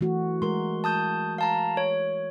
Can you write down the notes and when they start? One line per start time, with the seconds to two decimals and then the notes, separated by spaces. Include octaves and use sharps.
0.01 E3 A3 F#4
0.42 G#3 A#4 C6
0.84 A5 D#6 G6
1.38 F5 A5 A#5
1.77 C#5